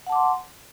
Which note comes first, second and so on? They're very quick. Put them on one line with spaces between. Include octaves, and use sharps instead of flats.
F#5 A5 D6 C6